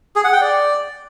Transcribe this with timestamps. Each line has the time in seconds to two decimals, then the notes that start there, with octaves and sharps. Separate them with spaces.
0.16 G#4
0.24 F#5
0.33 G5
0.41 D5